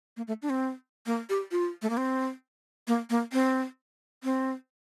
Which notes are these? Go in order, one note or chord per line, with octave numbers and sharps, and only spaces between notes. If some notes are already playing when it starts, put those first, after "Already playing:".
A#3
A3
D4
C4
A#3
G4
F4
A3
A#3
C4
A#3
A#3
C4
C4